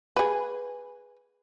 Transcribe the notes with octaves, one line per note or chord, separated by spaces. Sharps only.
G#4 B4